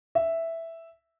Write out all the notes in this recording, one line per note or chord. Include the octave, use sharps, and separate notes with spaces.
E5